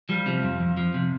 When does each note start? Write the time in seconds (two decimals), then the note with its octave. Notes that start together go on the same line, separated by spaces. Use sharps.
0.09 F3 G3
0.26 C3 F3
0.43 F2
0.60 F2
0.77 F3
0.94 C3